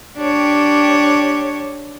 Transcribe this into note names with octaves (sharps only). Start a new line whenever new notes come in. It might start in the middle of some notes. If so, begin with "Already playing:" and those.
D4 G4 C#5